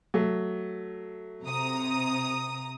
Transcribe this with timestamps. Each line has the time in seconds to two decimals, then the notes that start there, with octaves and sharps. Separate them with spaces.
0.14 F#3 A3
1.44 C3 A#5 D#6